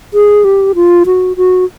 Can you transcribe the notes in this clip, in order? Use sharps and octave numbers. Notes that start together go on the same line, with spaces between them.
G#4
G4
F4
F#4
F#4